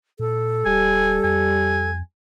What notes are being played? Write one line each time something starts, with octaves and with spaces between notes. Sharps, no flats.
A#2 A4
D#1 G3 G#5
F2 G#5